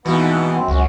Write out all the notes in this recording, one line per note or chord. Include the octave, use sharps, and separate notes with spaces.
D#2 G#2 B2 E3 B3
F#2 C4
C#2 F#2 F#4